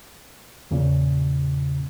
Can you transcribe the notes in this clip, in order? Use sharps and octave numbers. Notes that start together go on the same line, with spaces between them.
E2 A#2 C#3